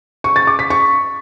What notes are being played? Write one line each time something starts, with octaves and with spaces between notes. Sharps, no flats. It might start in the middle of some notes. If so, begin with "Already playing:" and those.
C#6
A6
D6
B6
C#6